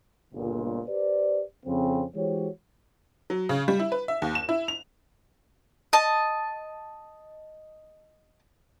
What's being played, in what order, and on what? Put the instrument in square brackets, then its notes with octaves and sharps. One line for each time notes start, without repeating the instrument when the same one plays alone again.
[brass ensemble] G1 C#2 A#2
G4 B4 C5 D5
F2 C#3 C4
E3 G#3 F#4 G4 C5 C#5
[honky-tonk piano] F#3
C#3
G3
E4
B4
E5
D#2
E7
E4
F7
[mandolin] D#5 A5